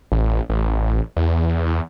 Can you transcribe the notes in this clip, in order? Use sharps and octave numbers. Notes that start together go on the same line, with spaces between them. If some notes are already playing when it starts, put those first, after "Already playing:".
A1
A1
E2
E2